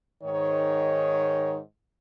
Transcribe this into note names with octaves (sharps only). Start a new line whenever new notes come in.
G#2 D#3 C#5